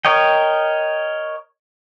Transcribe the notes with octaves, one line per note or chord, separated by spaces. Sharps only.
A#4 C#5 D#5 G5